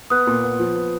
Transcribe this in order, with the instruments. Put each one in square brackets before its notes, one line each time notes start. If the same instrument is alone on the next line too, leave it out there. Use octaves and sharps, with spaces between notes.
[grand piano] B3 [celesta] D#6 F#6
[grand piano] A#2
B3
F3
B3